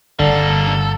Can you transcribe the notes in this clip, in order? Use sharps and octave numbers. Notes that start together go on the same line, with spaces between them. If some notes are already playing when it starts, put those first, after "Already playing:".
G1 D3 G3 A#3 A4